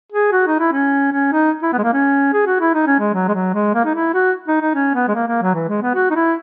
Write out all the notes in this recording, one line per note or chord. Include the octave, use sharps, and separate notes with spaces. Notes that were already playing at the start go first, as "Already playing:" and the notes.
G#4
F#4
D#4
E4
C#4
C#4
D#4
E4
B3
G#3
A#3
C#4
G#4
F#4
E4
D#4
C#4
G#3
F#3
G#3
F#3
G#3
A#3
D#4
E4
F#4
D#4
D#4
C#4
B3
G#3
A#3
A#3
F#3
E3
G#3
B3
F#4
D#4
E4